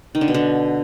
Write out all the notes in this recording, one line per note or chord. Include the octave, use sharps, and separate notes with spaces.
D#3
D3
B2
D3